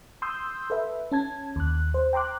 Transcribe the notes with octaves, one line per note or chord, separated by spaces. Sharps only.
C6 D#6 E6 G6
A4 B4 E5
C#4 A5 G#6
D#2 F#6
C5
G5 A#5 C6 D6 F#6